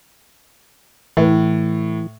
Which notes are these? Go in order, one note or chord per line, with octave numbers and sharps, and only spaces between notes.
A2 E3